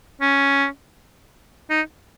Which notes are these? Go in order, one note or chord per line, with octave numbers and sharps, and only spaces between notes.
C#4
D#4